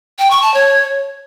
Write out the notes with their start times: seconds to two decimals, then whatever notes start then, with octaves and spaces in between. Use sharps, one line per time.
0.19 G5
0.31 C#6
0.42 A5
0.54 C#5